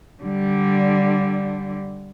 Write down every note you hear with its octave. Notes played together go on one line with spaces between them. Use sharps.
D3 G3